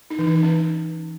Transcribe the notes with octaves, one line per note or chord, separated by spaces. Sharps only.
D#4
E3
D#4
E3
C#4